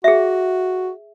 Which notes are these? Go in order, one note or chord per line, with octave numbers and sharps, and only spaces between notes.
F#4 G#4 E5